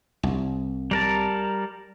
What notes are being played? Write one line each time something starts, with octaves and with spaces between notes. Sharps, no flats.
C2
G3 A#4 A5